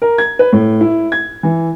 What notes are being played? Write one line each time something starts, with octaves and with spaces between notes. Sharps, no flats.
A#4
G#6
B4
A2
E4
G#6
E3